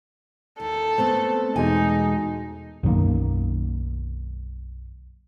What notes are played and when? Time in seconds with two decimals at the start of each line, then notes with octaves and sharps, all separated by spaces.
0.60 D#2 A4
0.98 A3 B3 C4 C5
1.56 E2 B2 G#3 D#4 G#5
2.83 B1 F#2 D#3 A#3